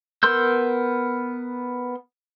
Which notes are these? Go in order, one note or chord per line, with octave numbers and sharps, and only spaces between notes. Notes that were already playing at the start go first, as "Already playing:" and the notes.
B3 A#4 C6 E6 G6